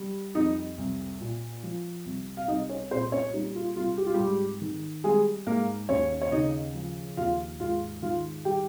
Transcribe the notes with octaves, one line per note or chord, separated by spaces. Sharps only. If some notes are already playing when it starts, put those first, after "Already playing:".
Already playing: G3
F2 D#4 D#5
C2
A#2
F3
C2
F5
C2 D#4 D#5
C#4 C#5
A#2 C4 C5
C#4 C#5
G3 D#4
F4
C2 F4
G4
F4
G#2 G3 G4
D#3
G3 G#3 G#4
G#2 A#3 A#4
D#2 C#4 C#5
C#5
C#3 D#4 D#5
F3
D#2 F4 F5
G#2 F4 F5
D#3 F4 F5
G3 G4 G5